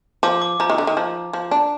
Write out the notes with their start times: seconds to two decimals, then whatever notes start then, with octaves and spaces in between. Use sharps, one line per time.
0.23 F3 D6
0.42 D6
0.60 F3 A#5
0.70 D#3
0.78 D3
0.87 D#3
0.97 F3
1.33 F3
1.51 D4